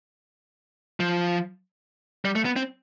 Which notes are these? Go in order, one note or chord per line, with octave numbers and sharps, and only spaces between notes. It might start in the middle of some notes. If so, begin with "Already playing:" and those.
F3
G3
A3
B3
C4